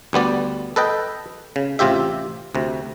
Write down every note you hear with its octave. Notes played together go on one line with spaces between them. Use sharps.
D2 G3 B3 D5
A4 B4 D#5 G5
C#3
A1 C3 F4 G4 E5
D2 C3